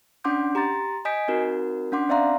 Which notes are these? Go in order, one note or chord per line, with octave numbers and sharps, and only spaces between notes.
C#4 D4 F#5 C6 D6 G6
G4 A#5 C6 A6
D#5 G#5 D#6 G6 B6 D7
C4 D#4 F#4 A#4
C#4 D4 F#5 C6 D6
C4 D5 E5 F5 A#5 C6